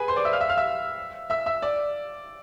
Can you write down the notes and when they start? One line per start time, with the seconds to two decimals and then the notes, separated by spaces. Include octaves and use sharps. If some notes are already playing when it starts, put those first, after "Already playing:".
Already playing: G#4 B4 G#5 B5
0.08 C5 C6
0.16 D5 D6
0.25 E5 E6
0.33 F5 F6
0.41 E5 E6
0.49 F5 F6
0.57 E5 E6
1.30 E5 E6
1.46 E5 E6
1.62 D5 D6